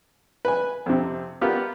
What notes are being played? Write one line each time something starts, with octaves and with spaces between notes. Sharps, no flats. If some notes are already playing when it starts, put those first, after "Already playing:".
B4 G#5
F2 C3
B3 F4 G4 A#4 B4